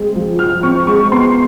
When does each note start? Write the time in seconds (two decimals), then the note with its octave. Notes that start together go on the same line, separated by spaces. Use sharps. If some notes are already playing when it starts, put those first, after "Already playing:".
Already playing: G#3 C4
0.16 F3
0.39 F3 F6
0.63 C4 C#6
0.87 G#3 C#6
1.11 B3 C6